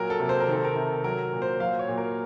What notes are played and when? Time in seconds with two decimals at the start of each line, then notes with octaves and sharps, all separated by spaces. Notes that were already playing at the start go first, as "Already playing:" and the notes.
Already playing: A#2 F#3 A#4
0.10 A4
0.20 C3
0.29 C5
0.41 A#4
0.48 D#3 A4
0.64 A#4
0.76 C3
1.04 F#3 A#4
1.33 A#2
1.42 C5
1.60 F#3 F5
1.79 C#5
1.89 A#2
1.98 A#4